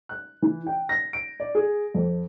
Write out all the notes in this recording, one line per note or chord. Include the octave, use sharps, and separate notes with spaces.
F#6
E3
G5
A#6
D7
D5
G#4
F2